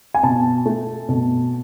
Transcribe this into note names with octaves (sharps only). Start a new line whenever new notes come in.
G#5
B2 A5
A3
B2